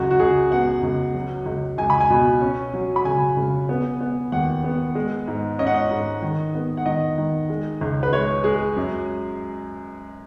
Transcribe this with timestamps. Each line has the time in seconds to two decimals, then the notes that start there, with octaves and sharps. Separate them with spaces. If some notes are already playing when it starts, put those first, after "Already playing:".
Already playing: C#2 F#2 F#4
0.11 F#4
0.20 C#2 G#4
0.51 B3 F#5
0.83 C#2
1.15 F#3
1.46 C#2
1.78 C#2 G#5
1.90 B5
2.00 G#5
2.10 B2
2.41 C#4
2.74 F#3
2.96 B5
3.05 C#3 G#5
3.37 C#3
3.69 B3
4.01 B3
4.32 D#2 F#5
4.64 B3
4.95 G#3
5.28 G#2
5.59 C#4 D#5
5.67 F#5
5.74 D#5
5.91 G#2
6.22 D#3
6.55 B3
6.77 F#5
6.86 D#3 D#5
7.18 D#3
7.50 G#3
7.81 C#2
8.03 B4
8.12 G#3 C#5
8.44 G#3 G#4
8.76 F#2